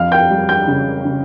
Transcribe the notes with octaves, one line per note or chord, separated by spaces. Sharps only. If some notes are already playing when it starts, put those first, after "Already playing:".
Already playing: F2 F5 F6
G5 G6
G3
G5 G6
C#3
C#3